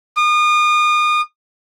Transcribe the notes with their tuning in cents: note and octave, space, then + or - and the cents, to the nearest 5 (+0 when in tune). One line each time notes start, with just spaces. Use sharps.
D#6 -35